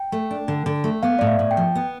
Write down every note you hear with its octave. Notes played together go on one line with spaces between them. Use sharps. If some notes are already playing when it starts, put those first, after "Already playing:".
Already playing: G5
A3
D4
D3
D3
A3
B3 F5
A2 D5
E5
A2
G5
F3
B3